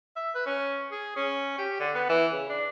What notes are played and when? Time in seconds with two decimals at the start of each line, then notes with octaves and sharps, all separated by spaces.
0.16 E5
0.35 B4
0.46 C#4
0.91 G#4
1.16 C#4
1.58 G4
1.79 D3
1.94 B3
2.09 E3
2.33 C#3
2.49 D4